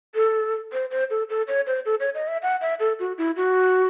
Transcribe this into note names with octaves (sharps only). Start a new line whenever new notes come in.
A4
C5
C5
A4
A4
C#5
C5
A4
C#5
D#5
E5
F#5
E5
A4
F#4
E4
F#4